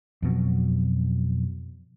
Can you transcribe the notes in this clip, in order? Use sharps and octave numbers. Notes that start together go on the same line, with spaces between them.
F2 B2 F#3